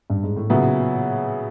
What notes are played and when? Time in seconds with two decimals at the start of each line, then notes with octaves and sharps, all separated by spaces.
0.10 G2
0.23 G#2
0.36 A2
0.50 A#2 C#3 F#3 B3 E4